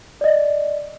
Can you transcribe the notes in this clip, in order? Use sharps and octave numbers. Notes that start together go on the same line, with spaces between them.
D5 D#5